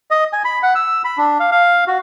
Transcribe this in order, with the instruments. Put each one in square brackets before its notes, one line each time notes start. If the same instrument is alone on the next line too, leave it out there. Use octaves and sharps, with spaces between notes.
[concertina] D#5
G#5
B5
F#5
E6
B5
D4
F5
F5
F#4